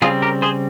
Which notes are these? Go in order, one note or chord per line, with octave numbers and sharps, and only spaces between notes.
C#3 G3 C4 F4 G#4
G4 A#4
G#4 C5